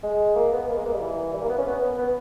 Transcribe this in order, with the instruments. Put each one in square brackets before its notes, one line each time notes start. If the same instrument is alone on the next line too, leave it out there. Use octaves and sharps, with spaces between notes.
[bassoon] G#3
A#3
B3
A#3
G#3
A#3
G3
E3
G3
A#3
B3
C#4
B3
B3